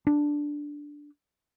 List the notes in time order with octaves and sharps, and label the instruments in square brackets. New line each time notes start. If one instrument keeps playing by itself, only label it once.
[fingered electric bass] D4